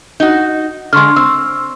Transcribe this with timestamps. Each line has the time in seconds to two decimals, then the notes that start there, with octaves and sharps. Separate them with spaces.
0.20 D#4 F#4
0.93 D3 G#3 C6 C#6 F6
1.16 C4 E6